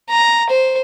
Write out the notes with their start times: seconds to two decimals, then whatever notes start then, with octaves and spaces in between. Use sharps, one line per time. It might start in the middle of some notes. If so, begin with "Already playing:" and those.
0.10 A#5
0.50 C5